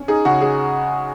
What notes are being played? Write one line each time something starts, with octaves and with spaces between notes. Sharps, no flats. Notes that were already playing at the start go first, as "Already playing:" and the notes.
Already playing: C#4
D#4 G#4
C#3 F#4
G#3 G#4